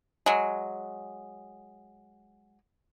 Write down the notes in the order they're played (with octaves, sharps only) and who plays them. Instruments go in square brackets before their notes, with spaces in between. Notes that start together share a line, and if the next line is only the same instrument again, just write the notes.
[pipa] F#3 G#3